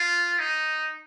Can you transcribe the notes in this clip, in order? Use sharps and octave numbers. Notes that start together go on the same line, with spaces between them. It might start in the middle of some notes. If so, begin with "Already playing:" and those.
Already playing: F4
D#4